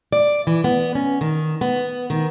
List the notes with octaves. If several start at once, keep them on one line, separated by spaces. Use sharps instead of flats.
D5
E3
B3
C#4
D#3
B3
D#3